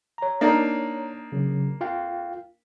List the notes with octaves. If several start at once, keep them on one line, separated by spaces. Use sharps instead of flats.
C#5 A#5
A#3 D4 D#4
C#3 F#3
F4 F5 G5